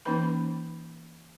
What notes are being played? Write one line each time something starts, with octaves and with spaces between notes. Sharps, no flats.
E3 A#3 C#4 D#4 B4 B5